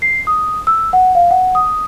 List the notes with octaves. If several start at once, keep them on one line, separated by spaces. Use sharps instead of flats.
C7
D#6
E6
F#5
F5
F#5
D#6